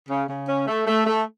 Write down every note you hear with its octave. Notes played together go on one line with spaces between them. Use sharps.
C#3
C#3
C#4
A3
A3
A3